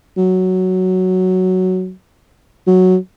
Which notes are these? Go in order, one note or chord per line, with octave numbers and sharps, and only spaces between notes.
F#3
F#3